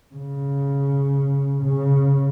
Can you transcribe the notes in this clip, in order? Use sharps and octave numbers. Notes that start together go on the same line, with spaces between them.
C#3
C#3